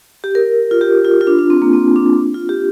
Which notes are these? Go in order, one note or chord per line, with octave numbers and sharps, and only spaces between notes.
G4
A#4
F4
G4
F4
F4
D4
D4
C4
A#3
C4
D4
F4
G4